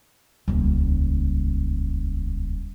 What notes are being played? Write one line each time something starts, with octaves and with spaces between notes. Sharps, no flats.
D#1 C#2